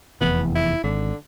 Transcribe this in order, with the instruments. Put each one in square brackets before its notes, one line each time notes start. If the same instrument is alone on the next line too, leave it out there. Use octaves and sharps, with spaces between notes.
[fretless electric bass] F1 E2 E3 [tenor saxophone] B3
[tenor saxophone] E4
[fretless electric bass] G#1 [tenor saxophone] D3